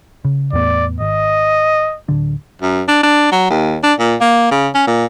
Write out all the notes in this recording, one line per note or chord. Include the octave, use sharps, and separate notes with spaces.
C#3
E2 A2 B3 D5
G#1 D#5
D1 D3 D4
F#2
D4
D4
F#3
D#2
D4
A#2
A#3
C#3
C#4
A#2